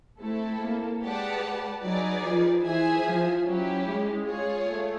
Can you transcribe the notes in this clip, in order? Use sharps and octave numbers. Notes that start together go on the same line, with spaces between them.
A3 C4 E4 A4
A#3
G#3 G4 B4 D5 F#5 A5
F#3 D#4 G#4 B4 D5
F3
E3 G#4 C5 E5 G#5
F3
F#3 C#4 E4 G4
G#3
F4 G#4 C#5
A3